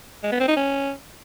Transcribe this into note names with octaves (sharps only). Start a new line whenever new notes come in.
G#3
B3
C4
D#4
C#4